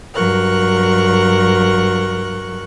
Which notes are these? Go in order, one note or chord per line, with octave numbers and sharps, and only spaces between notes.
G2 F#3 A#4 C#6 F#6